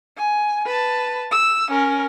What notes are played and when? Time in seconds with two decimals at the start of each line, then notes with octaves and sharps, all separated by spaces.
0.17 G#5
0.66 B4 A5
1.31 E6
1.71 C#4 A#4